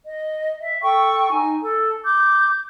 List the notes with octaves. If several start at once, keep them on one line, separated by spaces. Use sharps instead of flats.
D#5
E5
A4 G5 C#6
D#4 G#5
A4
D6 G6